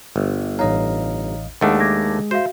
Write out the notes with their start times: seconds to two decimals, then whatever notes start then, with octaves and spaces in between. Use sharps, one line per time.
0.16 G1
0.59 A1 D#4 C#5 D#5 F5 A#5
1.61 D#2 G#3 A3 D4 G#4 E5 F#5
1.80 D6 G#6 A#6
2.31 F#4 C5 E5 F5